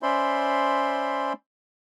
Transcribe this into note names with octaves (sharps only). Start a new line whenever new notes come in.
C#4 C5 D5 E5 B5 C6